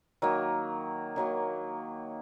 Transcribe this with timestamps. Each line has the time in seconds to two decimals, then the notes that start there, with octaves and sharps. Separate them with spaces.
0.22 D#3 F#3 A#3
1.16 D#3 F#3 A#3